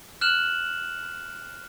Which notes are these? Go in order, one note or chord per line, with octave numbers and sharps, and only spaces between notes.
F6 F#6 E7 F#7